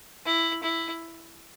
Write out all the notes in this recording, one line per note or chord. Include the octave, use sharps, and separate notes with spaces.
E4
E4